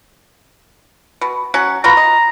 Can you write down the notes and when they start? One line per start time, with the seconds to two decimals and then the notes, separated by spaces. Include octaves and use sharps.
1.21 B2
1.54 F#3 C#4 F#5
1.84 B3 F4 F#4 A#5
1.97 D#5